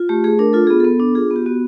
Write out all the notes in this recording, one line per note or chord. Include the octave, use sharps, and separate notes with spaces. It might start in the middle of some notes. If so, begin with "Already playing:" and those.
Already playing: F4
A3 G4
A3 G#4
D4 A#4
F4 A4
B3 G#4
B3 A4
D4
F4 G#4
B3
G4
B3 F#4